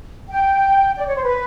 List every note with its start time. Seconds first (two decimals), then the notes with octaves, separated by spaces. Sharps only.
0.29 G5
0.98 D5
1.07 C#5
1.15 C5
1.24 B4